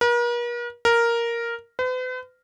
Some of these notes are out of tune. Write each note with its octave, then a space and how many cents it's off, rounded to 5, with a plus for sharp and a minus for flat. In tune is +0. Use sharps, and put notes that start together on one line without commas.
A#4 +45
A#4 +0
B4 +45